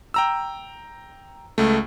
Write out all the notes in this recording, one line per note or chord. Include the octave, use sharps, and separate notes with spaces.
G5 A#5 E6
C#2 A3